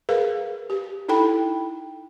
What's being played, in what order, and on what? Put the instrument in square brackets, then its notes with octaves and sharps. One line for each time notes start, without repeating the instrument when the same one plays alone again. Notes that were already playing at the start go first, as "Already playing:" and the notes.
[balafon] G#4 A#4 B4 F5
G4
D#4 E4 A4 G5 B5